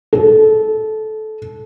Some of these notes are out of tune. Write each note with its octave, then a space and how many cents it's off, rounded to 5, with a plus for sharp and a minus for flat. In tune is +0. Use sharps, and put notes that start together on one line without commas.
A4 -20